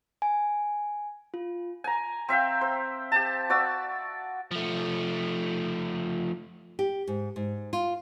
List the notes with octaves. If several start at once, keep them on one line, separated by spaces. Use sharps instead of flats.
G#5
F4
G#5 A#5
C4 E5 F5 G5
C5
G4 A5
F#4 D5 C#6 E6
F3 A3
G4
G#2
G#2
F4